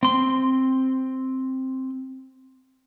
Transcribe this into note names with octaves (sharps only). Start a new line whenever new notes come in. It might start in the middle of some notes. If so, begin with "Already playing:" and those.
C4 C6